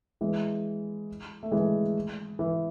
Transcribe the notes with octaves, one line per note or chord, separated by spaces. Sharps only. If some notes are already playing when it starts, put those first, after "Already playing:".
E3 G#3
A3
E3 G#3
E3